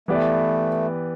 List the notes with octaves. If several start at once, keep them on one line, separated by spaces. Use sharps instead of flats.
E3 A3 B3 G4 B4 D5